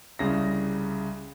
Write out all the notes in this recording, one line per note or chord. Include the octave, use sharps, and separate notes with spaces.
C2 C#3 A#6